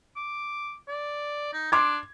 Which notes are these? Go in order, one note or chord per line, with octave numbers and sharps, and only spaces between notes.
D6
D5
D#4
D4 C6 D6 G#6